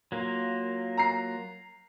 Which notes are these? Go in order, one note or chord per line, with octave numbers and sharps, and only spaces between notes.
F#3 A#3 F4
A#5 C7